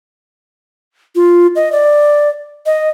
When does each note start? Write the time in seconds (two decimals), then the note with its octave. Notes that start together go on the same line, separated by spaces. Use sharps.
1.15 F4
1.56 D#5
1.72 D5
2.66 D#5